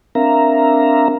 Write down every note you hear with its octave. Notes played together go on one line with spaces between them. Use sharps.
C4 D4 A#4 E5 F5 A#5